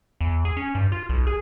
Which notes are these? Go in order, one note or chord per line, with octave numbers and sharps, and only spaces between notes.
E2
G#4
C#4
G2
F4
B1
G#4